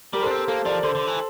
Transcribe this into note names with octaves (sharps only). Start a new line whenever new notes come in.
G3 G4 A#4
D4 A4 C5
C4
A#3 A4 C5
F3 A#4 D5
D3 A4 C5
D3
E3